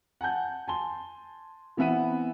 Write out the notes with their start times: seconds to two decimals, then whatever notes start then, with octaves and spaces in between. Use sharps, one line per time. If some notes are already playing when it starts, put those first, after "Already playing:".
0.21 F#5 G#5 A5 G6
0.68 G#5 A5 C6 G7
1.77 E3 B3 C4 E5 F#5 D#7